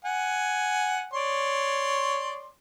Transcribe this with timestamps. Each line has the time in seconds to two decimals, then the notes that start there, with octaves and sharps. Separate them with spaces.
0.05 F#5 G#5
1.13 C#5 D5 C6